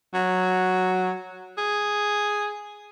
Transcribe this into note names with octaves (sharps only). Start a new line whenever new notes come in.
F#3
G#4